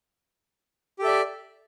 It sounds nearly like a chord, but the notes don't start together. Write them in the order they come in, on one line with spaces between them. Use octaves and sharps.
G4 A4 E5 D5